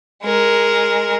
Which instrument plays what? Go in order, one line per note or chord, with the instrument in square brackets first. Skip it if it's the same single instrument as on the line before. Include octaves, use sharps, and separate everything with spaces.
[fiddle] G#3 A#4